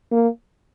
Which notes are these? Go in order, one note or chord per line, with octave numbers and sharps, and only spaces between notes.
A#3